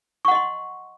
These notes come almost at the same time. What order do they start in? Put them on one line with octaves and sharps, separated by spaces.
C#6 F#5 D#5 C6